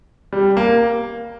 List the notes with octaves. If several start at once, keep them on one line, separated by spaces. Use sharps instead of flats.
G3
A#3